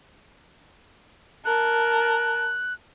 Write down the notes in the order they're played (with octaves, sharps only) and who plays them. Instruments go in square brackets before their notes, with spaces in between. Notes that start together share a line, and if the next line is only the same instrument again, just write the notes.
[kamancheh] A#4 A5 [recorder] F#6